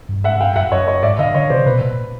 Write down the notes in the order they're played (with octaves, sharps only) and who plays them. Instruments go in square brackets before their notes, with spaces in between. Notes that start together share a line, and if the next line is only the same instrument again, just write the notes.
[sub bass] G2
[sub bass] G#2 [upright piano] E5 F#5
[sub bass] G2 [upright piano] F5 G5
[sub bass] F#2 [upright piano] E5 F#5
[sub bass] F#2 [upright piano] C#5 D#5
[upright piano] C#5 D#5
[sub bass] G#2 [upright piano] D5 E5
[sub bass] D3 [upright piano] D#5 F5
[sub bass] D3 [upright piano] C#5 D#5
[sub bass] C3 [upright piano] C5 D5
[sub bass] B2 [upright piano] B4
[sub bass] A#2